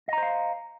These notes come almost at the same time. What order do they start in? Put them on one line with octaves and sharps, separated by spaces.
D#5 A#5 C5 F5